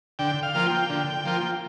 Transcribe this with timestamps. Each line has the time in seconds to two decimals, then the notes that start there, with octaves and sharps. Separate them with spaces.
0.19 D3 G5
0.43 F5
0.54 F3 A#3 F4
0.66 G5
0.90 D3
1.25 F3 A#3 F4